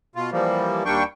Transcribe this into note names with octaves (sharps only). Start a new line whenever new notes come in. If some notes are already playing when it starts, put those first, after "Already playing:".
B2 F4
E3 F3 G3 A#3
D#2 G3 A#3 D4 G5 C#6